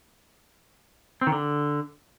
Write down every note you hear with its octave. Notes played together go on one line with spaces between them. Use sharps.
C4
D#3
D3